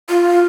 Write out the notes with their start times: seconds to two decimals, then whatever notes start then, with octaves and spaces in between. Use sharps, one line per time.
0.09 F4